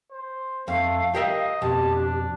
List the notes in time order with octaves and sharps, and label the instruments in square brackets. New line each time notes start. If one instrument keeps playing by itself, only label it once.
[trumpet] C5
[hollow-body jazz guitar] F2 [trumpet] A3 [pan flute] F5
[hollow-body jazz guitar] G4 A#4 E5 [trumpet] D#5
[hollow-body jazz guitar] F2 B2 [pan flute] G4 [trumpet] A5
[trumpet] D4